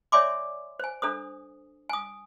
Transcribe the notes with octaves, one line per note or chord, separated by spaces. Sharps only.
C#5 D5 E5 G#5 C6 D6
C5 G#5
D4 A4 C5 D#6
G#5 D#6